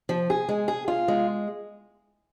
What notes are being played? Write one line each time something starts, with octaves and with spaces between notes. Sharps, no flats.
F3
G#4
G#3
G#4
F4
G#3